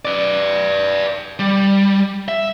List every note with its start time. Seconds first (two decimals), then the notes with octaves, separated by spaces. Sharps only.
0.05 B4 D5
1.39 G3
2.28 E5